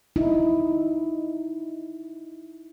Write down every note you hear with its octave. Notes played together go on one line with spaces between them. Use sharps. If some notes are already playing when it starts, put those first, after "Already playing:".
D#4 E4